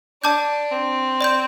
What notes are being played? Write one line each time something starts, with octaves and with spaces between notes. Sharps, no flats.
D4 D5 A5 D6 G6
C4
D5 C6 G6